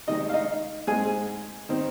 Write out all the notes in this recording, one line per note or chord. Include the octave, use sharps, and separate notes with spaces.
C3 D#3 G#3 D#4 D#5
F5
D#4 D#5
G#2 G#3 C4 G#4 G#5
D#3 C4